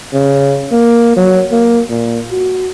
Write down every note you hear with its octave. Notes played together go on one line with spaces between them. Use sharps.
C#3
A#3
F#3
A#3
A#2
F#4